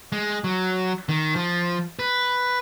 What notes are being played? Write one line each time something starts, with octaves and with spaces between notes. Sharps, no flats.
G#3
F#3
D#3
F3
B4